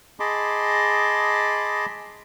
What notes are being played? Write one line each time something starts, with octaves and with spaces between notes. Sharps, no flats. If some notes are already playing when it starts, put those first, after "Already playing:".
G#4 D#5 A5 B5 C6 D6